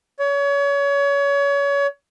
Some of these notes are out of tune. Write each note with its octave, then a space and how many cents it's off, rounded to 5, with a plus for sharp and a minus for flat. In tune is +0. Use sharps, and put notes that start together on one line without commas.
C#5 +30